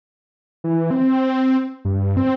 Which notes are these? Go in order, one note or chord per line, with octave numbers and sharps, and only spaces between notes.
E3
C4
G2
C4